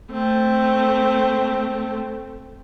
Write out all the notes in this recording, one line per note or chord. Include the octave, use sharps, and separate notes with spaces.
A3 C4